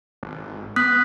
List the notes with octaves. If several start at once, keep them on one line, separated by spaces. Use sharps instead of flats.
G#1
B3 D#6 F#6 B6